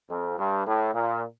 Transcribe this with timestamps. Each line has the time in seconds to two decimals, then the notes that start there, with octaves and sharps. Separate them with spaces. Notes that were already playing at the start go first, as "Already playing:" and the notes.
0.10 F2
0.38 G2
0.66 A2
0.94 A#2